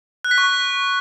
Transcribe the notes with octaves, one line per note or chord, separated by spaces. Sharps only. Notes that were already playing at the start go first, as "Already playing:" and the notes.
F#6
B6
C#6